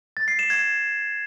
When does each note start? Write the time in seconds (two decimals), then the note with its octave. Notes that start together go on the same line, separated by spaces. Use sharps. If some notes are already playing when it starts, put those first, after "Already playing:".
0.17 A6
0.28 C7
0.39 E7
0.50 G#6